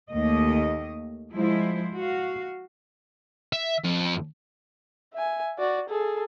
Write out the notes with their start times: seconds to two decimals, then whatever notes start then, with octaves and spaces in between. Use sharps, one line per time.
0.10 D#2 A3 A#3 D#5
1.33 F3 G#3 E4 C5
1.95 F#4 F5
3.53 E5
3.84 F2
5.14 E5 G#5
5.59 F#4 D5
5.89 G#4 A4